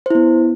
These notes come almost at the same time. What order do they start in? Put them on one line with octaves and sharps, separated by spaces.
C5 E4 B3